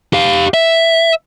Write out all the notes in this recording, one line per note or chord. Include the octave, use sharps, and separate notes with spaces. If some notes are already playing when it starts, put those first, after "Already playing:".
G4 F5
E5